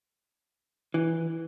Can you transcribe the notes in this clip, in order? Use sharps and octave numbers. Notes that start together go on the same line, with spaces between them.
E3